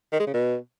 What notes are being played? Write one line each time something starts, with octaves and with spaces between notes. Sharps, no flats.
D#3
G#3
C#3
B2